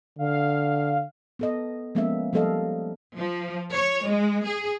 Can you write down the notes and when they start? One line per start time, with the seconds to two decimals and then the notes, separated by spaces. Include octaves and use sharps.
0.19 D3 F5
1.39 B3 A4 D#5
1.95 F3 G#3 A#3 B3 C#4 E5
2.33 F3 G3 A#3 A4 D#5 F5
3.18 F3
3.74 C#5
4.08 G#3
4.46 G#4